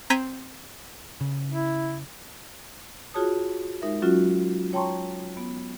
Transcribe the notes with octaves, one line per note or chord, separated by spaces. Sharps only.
C4 A#5 G6 G#6 B6 D#7
C#3
E4
F4 F#4 G#4 C#5 A5 D#6
G#3 D#4 A#4 E5
F#3 C#4 F4 F#4
C#5 G5 A5 A#5 C6 C#6
B3